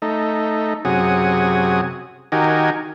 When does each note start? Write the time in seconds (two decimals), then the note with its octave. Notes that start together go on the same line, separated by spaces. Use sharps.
0.02 A3 D#4
0.85 F#2 C3 F#4 G#4 C#5 D#6
2.32 D#3 D#4 F#4 G4 A#4 G#5